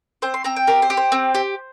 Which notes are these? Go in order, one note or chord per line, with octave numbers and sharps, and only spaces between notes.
C4 C5
C6
C4 A#5
G5
G4 A#4
C5
G4
C5
C4
G4